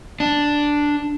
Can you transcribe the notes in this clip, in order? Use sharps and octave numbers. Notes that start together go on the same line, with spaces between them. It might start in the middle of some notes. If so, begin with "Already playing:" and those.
D4